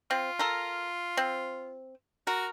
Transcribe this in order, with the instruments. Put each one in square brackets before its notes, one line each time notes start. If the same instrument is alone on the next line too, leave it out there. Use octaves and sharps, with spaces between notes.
[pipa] C4 [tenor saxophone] F4
[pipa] A4 A#4
C4
[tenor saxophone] F#4 [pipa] A#4